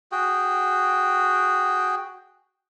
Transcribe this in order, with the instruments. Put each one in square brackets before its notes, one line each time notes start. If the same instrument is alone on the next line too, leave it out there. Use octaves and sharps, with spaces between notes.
[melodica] F#4 G#4 G5